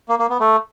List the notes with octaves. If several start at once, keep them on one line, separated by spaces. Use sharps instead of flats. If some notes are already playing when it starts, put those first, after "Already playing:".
A#3
A#3
B3
A3